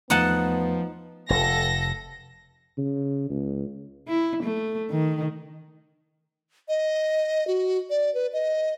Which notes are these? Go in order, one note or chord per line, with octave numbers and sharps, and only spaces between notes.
E2 F3 A3 B3 D#4 F#5 A5
F1 A4 A#6
C#3
C#2
E4
A3
D#3
D#5
F#4
D5
B4
D#5